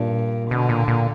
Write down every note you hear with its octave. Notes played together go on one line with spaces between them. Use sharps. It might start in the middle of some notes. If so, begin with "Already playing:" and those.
Already playing: G2 A#2
B2 D3
A#2
A#2